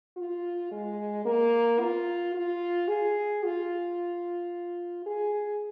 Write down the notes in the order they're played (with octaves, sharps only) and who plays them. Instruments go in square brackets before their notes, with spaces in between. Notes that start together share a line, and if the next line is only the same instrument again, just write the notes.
[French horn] F4
G#3
A#3
F4
F4
G#4
F4
G#4